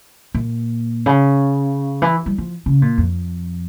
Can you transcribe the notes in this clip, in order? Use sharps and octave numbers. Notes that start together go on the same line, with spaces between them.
A#2
C#3
E3
G3
F3
C#3
A#2
F2